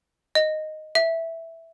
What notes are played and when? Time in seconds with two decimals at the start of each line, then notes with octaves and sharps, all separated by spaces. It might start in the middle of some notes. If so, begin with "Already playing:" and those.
0.35 D#5
0.95 E5